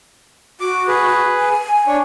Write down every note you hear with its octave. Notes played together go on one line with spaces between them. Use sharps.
F#4 D6
G#4 B4
G#5
D4 C#5